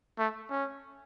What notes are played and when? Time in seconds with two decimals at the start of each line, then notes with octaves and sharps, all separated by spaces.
0.18 A3
0.50 C#4